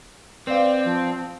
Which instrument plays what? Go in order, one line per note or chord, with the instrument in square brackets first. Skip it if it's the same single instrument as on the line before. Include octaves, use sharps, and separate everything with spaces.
[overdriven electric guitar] C4 [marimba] B4 F5 [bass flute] D5
[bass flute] F3